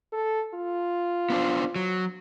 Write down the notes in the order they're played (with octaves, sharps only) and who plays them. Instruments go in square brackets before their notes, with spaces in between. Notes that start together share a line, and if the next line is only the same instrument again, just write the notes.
[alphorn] A4
F4
[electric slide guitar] B3 D4 C5
F#3